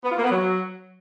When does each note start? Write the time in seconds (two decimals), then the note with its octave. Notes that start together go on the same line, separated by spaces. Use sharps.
0.04 B3
0.10 F4
0.17 A#3
0.24 B3
0.30 F#3